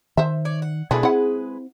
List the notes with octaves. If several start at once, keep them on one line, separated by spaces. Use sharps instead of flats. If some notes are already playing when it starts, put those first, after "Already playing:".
D#3 C5 E5
C#5 D5
F#5
B2 E3 G#3 A3 D4 G#4 B4
C4 E4 F#5